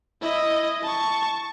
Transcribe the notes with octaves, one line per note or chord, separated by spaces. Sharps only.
E4 D#5
A5 C#6